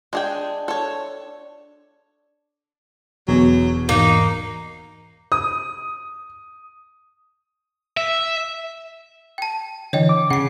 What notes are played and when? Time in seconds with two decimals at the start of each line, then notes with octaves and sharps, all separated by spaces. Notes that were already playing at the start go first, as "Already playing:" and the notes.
0.13 G#3 D4 G#4 G5
0.68 A4 C#5
3.28 E1 E2 B2 F#3 D4
3.89 E1 G#2 E3 A#3 D#4
5.32 D#6
7.97 E5
9.38 G5 A5
9.93 D3 E3 C#5 D#5 G5
10.09 D6
10.30 C#3 F#5 C7